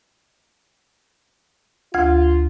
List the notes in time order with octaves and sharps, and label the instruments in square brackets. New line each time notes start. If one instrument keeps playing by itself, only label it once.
[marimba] D2 G#6 [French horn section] F4